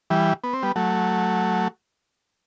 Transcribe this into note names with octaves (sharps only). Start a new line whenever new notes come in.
E3 G3
B3
C4
G3 B3
F#3 A3